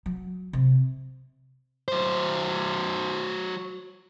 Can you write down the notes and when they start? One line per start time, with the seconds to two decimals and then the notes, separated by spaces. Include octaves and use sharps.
0.06 F#3
0.53 C3
1.88 F#3 C5